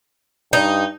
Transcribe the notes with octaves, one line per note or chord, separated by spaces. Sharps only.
G2 D#4